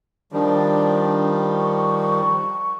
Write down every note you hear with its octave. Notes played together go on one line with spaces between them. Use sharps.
D#3 F3 G3 D4
C#6